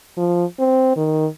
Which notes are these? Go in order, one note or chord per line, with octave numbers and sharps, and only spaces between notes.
F3
C4
D#3